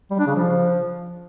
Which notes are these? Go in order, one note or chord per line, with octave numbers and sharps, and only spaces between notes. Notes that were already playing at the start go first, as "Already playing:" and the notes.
G3
D4
C#3
F3